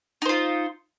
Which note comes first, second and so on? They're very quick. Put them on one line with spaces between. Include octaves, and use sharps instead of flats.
D#4 C5 F4